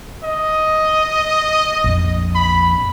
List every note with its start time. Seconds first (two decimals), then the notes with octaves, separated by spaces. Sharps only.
0.23 D#5
1.84 A#1 F2
2.35 B5